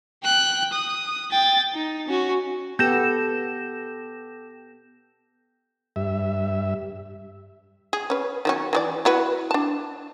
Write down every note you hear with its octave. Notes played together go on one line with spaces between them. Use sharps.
G5 F#6
D#6
G5 A6
D#4
C#4 F#4
B3 G4 A4 G6 A#6 E7
G2 E5
G#4
C#4 B4
D#3 F#3 C#4
E3 G#4 D5
E4 F#4 B4
D4 A5